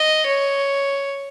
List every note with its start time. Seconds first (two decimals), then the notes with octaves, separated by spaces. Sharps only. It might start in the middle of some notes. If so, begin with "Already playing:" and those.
Already playing: D#5
0.27 C#5